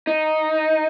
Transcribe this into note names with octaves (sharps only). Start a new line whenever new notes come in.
D#4